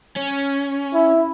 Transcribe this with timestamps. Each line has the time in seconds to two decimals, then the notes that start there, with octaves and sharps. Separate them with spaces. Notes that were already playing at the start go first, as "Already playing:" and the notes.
0.17 C#4
0.93 E4